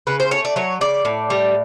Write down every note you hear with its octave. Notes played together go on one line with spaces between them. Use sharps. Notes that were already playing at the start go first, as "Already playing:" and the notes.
C#3 B4
C5
A3 C#5
D5
F#3 C#5
C#3 D5
A2
G3